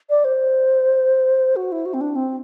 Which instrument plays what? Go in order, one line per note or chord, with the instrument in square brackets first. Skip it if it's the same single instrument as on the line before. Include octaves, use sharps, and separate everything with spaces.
[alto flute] D5
C5
F#4
E4
F#4
C4
D4
C4